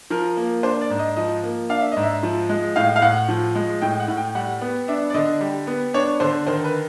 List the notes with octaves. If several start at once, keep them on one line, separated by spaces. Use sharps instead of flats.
F3 A#4
A#3
D4 C5
D5
G#2
D#5
F3 D#5
A#3
D4 F5
E5
G#2 D#5
E5
F3
G#3
A2 F5
F5
A2 F#5
F3
G#3
A2 G5
F#5
A2
G5
G3 F#5
B3
D4 E5
D5
D3 D#5
G3
B3
D4 C#5
D3 C5
D#3 C5
B4